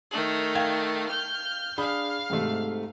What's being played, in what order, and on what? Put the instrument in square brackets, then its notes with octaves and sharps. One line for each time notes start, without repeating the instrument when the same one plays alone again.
[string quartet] D#3 A3
[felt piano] F5 G5 G#6
[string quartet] F6 G6
[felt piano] D4 G#4 B5 [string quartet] F5
[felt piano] G#2 C3 A3